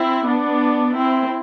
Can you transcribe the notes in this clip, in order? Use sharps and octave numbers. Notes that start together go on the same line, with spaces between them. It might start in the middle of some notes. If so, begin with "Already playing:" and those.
Already playing: C4 E4
B3 D4
C4 E4